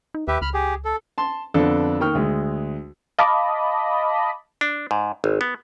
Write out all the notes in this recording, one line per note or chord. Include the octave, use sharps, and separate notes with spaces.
D#4
D#2 G4 B4 E5
C#2 B5 F6
G4 G#4
A4
A5 C6
F2 D3 B3 D4 A4
D#3 A#3 G5 C#6 F6
D2 G#3
D#5 F5 A5 B5 D6
D4
G#2
G#1
B3